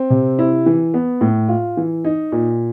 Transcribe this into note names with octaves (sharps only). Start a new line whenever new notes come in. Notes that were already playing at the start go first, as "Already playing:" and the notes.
Already playing: C4
C3
E4
E3
B3
A2
F4
E3
D#4
A#2